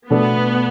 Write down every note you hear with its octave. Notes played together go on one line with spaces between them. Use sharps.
B2 A3 B3 D4